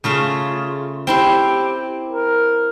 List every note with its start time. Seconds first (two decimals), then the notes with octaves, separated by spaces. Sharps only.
0.04 C#3 A3 F4 G#4
1.07 C4 E4 G4 C6
2.09 A#4